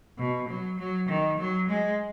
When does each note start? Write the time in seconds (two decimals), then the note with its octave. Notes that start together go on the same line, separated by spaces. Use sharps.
0.18 B2
0.49 F#3
0.78 F#3
1.09 D#3
1.39 F#3
1.69 G#3